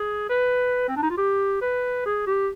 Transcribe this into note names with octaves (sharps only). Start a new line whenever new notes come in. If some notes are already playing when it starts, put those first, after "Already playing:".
Already playing: G#4
B4
C4
D4
D#4
F4
G4
B4
G#4
G4